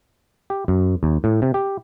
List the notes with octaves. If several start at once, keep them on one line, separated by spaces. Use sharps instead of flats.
G4
F#2
D#2
A2
C3
G4